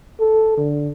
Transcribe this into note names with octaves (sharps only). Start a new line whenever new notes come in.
A4
D3